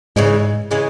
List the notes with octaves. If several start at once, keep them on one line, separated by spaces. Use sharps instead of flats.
G#2 C#3 E3 G#3
C#3 E3 G#3